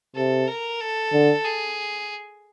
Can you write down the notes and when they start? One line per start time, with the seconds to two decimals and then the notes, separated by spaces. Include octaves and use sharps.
0.16 C3 A4
0.48 A#4
0.81 A4
1.13 D3
1.45 G#4